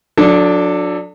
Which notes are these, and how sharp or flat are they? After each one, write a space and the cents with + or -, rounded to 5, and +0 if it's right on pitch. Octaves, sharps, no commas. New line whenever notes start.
F#3 -40 D4 +0 A4 +0